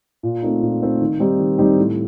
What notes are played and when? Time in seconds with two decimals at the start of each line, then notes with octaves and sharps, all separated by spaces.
0.23 A#2
0.42 A3 C4 D#4
0.62 A#2
0.81 A3 C4 D#4
1.00 D#3
1.20 G3 C4 D#4 G4
1.39 D#3
1.58 G3 C4 D#4 G4
1.78 A2